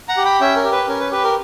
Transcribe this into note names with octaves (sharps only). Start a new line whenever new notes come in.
F#5 A#5
G4
G5 B5
C#4 E5 G5
A#4
G4
B4
C#4 A#4
B4
G4 B4
A#4